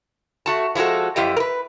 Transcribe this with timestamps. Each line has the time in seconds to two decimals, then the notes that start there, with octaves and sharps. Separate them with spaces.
0.46 A3 F#4 A5
0.75 F3 G#3 E4 F#4 A4
1.16 F#2 F3 E4 G4 D#5
1.36 A#4 B4